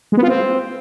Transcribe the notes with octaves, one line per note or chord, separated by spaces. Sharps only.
G#3
B3
F4
C4